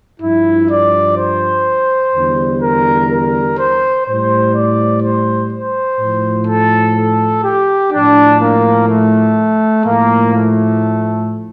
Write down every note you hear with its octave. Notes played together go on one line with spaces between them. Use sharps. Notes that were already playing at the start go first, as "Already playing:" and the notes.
G2 F3 E4
D5
C5
E2 D3 G3
A#4
A#4
C5
A2 G3 C5
D5
C5
C5
A2 F3
A4
A4
G4
A2 F3 D4
A#3
A3
A2 F3 A#3
A3